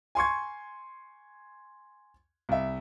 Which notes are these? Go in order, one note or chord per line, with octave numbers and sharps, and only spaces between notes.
G#5 C6 C#6 G#6
C2 E5